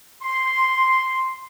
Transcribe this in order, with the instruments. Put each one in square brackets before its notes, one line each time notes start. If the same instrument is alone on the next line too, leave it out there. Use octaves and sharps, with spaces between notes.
[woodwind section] C6